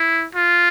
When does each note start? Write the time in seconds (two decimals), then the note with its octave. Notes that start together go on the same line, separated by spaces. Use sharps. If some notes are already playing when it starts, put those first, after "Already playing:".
Already playing: E4
0.35 F4